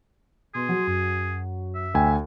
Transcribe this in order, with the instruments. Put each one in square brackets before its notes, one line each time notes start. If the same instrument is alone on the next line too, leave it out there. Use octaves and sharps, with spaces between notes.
[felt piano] B2 [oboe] G#4 [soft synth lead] C6
[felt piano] F#3
[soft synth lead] F#2
[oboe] E5
[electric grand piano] D2 G#5 [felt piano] G5